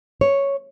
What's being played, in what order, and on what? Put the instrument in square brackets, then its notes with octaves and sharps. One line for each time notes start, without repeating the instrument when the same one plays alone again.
[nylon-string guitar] C#5